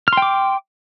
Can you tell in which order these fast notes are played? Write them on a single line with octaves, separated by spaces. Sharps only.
F6 C6 G5 D6